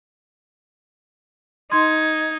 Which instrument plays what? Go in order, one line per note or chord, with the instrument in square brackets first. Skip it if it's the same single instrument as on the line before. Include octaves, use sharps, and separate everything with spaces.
[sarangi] D#4 [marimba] C6 [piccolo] G#6